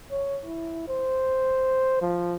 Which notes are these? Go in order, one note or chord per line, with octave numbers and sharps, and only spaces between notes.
C#5
E4
C5
F3